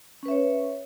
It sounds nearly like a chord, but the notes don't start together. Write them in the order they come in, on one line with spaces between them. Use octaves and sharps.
C#4 B4 E5 C#5